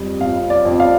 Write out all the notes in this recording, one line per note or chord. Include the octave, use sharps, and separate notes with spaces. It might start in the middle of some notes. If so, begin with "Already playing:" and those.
Already playing: F2 G3
F2 F5
D5
F2
F5